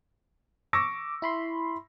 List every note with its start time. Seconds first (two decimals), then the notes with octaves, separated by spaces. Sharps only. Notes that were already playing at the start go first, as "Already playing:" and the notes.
0.73 C#6 D6 E6 A#6
1.22 E4 B5 C6